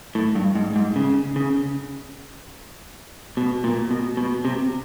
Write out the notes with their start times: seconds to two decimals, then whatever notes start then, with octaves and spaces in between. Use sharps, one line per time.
0.15 A2
0.35 G2
0.55 G#2
0.76 G#2
0.96 C#3
1.36 C#3
3.37 B2
3.64 A#2
3.91 B2
4.17 B2
4.45 C3